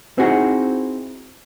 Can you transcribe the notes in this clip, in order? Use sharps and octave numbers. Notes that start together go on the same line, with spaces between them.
C4 D#4 E4 F#4 G#4